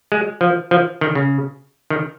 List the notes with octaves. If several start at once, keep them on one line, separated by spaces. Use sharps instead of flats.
G#3
F3
F3
D#3
C#3
D#3